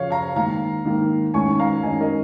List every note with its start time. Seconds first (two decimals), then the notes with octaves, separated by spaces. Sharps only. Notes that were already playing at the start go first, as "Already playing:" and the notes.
Already playing: C#3 F3 C#4 C#5 F5
0.11 F5 A#5
0.36 G#2 D#3 A#3 F5 A#5
0.85 G#2 D#3 A#3
1.34 G#2 D#3 C#4 G#5 C#6
1.60 F5 A#5
1.83 G#2 D#3 C#4 D#5 G#5
2.00 A#4 D#5